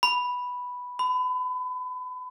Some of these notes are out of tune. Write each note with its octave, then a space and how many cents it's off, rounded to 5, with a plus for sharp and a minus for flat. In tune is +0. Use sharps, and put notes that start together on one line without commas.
B5 +0
B5 +30